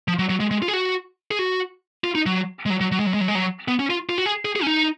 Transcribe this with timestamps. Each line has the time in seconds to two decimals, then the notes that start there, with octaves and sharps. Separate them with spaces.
0.08 F3
0.19 F#3
0.29 F#3
0.40 G#3
0.51 G#3
0.62 F4
0.68 G#4
0.73 F#4
1.31 G#4
1.39 F#4
2.04 F4
2.15 D#4
2.26 F#3
2.66 G#3
2.70 F#3
2.81 F#3
2.92 F#3
3.00 G#3
3.06 F#3
3.14 G#3
3.21 F#3
3.28 G#3
3.35 F#3
3.68 B3
3.79 C#4
3.90 F4
4.09 F4
4.18 F#4
4.26 G#4
4.45 G#4
4.56 G#4
4.63 C#4
4.67 D#4